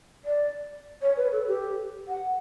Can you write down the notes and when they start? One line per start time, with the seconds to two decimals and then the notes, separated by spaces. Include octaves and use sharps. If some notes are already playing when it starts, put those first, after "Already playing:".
0.25 D5
1.02 C#5
1.17 B4
1.32 A4
1.47 G4
2.08 F#5